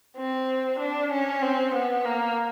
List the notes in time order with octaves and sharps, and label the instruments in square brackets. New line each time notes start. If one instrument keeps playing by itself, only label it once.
[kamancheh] C4
D4
C#4
C4
B3
A#3